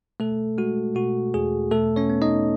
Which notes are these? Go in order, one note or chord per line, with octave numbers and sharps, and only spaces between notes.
B2 A3 A4
G#3 F#4
B2 F#4
E2 G#4
B2 A3 A4
C#4 C#5
B3
D#4 D#5